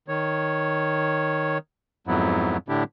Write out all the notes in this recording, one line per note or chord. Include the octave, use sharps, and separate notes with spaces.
D#3 C#5
F2 G#2 F#3 B3 E4
A2 D3 D4 E4 G4